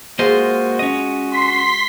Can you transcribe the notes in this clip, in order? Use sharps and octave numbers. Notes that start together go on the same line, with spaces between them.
G#3 A#3 F4 F#4 C5 D#5
C#4 D#5
C6 B6